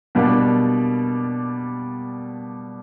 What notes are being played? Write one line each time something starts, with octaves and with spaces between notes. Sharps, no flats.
B2 G3 A#3 D4